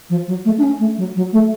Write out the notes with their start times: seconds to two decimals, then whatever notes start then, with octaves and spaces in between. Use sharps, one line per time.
0.10 F3
0.27 F#3
0.45 A3
0.58 D4
0.62 C#4
0.80 A3
0.97 F#3
1.16 F#3
1.32 A3